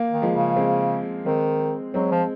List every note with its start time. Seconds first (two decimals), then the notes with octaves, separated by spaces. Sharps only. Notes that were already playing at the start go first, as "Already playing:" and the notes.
Already playing: A#3
0.11 D#3
0.22 F3 G#3
0.33 C#3
0.56 G#3 C4
1.26 D#3 G#3 C4
1.94 F#3 G#3 C4
2.11 F3